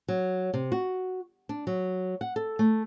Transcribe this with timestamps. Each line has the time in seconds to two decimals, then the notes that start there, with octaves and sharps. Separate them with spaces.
0.08 F#3
0.54 C3
0.72 F#4
1.49 D4
1.67 F#3
2.21 F#5
2.36 A4
2.59 A3